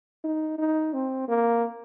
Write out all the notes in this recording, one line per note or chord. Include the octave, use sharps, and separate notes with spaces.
D#4
D#4
C4
A#3